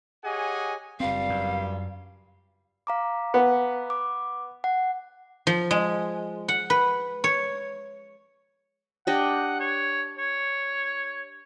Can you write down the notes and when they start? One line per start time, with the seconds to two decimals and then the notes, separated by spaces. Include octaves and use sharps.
0.24 G4 G#4 C#5 D#5 F#5 G#5
1.00 F#1 G2 A#2 G3 C4 F5
1.29 F#2
2.87 F5 A#5 D6
3.34 B3
3.90 D6
4.64 F#5
5.47 F3
5.71 G#3
6.48 F#5
6.70 B4
7.24 C#5
9.07 D4 G4 D#5 F#5
9.60 C#5
10.18 C#5